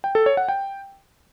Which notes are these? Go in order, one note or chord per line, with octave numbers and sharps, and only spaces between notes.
G5
A4
C#5
F#5
G5